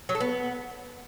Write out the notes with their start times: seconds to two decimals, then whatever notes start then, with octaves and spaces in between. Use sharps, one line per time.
0.09 F#3
0.15 A4
0.20 B3